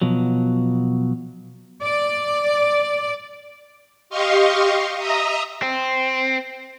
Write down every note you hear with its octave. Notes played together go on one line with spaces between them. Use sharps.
B2 F3 F#3
D5
G4 D#5 F5 C6 C#6
D#5 E5 A#5 D#6
C4